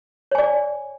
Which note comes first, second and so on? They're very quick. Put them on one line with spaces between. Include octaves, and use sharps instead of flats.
C#5 G#5 D5